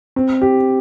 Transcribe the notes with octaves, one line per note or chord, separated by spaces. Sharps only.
C4
G4